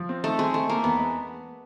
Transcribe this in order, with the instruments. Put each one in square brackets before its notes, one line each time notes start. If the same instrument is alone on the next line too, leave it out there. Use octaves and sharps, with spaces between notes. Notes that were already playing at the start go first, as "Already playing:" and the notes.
Already playing: [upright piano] F3
C4
[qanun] A3 [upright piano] D#4
[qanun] G#3 [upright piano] C4
[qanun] A3 [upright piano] D#4
[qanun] A#3 [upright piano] C4
[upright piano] E2 [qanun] B3
[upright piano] G#3